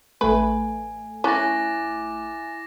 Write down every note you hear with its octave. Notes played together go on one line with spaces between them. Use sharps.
A1 A3 B4 G#5
C#4 E4 G#5 D6 F#6 A6 A#6